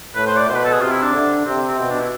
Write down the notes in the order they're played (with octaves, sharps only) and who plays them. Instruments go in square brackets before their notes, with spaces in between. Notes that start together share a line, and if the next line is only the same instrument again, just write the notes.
[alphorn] A2 [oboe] B4
[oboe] C5
D5
[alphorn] B2 [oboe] C5
[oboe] B4
A4
G#4
[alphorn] C3 [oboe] F4
[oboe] E4
D4
[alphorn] D3
[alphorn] C3 [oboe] C4
[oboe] C4
[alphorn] B2 [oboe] C4
[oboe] D4
E4